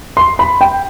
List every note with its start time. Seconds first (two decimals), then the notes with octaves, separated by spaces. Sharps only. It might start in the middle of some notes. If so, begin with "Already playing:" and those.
0.17 C6
0.39 B5
0.61 G5